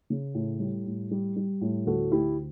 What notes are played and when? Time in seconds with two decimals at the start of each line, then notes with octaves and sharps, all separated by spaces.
0.10 C#3
0.34 A2
0.60 G3
0.86 A2
1.11 G3
1.36 G3
1.61 A2
1.86 D2 F#4 A4
2.12 D2 E4 G4